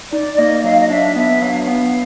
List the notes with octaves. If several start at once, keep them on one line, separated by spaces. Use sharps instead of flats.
D#4 D5
A#3 D#5
F#3 F5
D#5
D4 E5
B3 E5
F#3 F5
B3